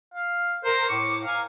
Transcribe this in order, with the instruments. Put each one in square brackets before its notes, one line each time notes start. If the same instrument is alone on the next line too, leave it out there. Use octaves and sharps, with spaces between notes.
[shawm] F5
[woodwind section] A#4 [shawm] C5
[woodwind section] A2 D6 [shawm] C#6
[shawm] F5 [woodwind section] G#5 A#5 D6